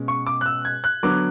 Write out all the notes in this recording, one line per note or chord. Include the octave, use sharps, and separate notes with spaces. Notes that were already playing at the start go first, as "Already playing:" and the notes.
Already playing: B2 G#3 C#4
C#6
D6
F#6
E6
G#6
F#6
D3 F#3 B3 D6